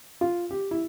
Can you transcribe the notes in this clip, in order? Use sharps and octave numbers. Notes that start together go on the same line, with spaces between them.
F4
G4
E4